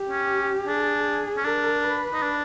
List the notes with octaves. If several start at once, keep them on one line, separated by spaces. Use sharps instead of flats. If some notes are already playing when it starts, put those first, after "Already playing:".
Already playing: G4
C#4
D4 G#4
C#4
D4 A#4
B4
D#4
D4